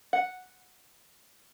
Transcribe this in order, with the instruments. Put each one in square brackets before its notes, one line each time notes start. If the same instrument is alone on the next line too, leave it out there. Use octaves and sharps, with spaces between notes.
[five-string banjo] F#5